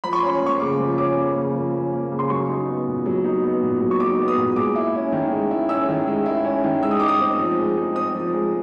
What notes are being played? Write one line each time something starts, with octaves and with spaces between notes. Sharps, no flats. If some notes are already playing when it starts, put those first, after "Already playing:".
F3 B5
C#6
C#4 C6
A#3 C#6
C#3 D6
F3
C#4 D6
A#3
C#3
F3
C#4
A#3
C#3
C6
F#3 C#6
D#4
B3
A#2
F#3
D#4
B3
A#2
F#3
C#6
D#4 D6
B3
D#6
A#2
G#3 D6
E4
C#4
D#3
G#3
E4
C#4 E6
D#3
G#3
E4
C#4
D#3
G#3 E6
D#6
D#4 D6
D#6
C4
F3
G#3
D#4
C4 D#6
F3
G#3